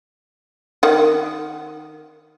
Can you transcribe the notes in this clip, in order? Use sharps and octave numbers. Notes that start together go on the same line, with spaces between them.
D#3 F#5